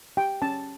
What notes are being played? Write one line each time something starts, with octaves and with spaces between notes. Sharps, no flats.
G4 G5
C#4 A5